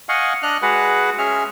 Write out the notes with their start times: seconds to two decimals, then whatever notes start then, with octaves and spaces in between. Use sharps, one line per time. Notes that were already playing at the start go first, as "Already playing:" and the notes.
0.09 D#5 F5 F#5 G#5 C#6
0.43 D4 D#5 F6 F#6
0.62 G#3 F#4 G#4 B4 F#5
1.18 G#3 C#4 G#4 E5 F6